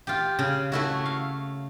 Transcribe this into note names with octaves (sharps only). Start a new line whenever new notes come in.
F4 G4
C#3
A3 E4 F#4
F5